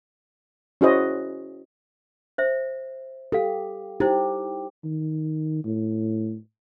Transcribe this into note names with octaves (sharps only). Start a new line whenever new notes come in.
C#4 E4 F#4 G#4 C5 D#5
C5 E5
G4 A4 F5
D#4 E4 G4 C5
D#3
A2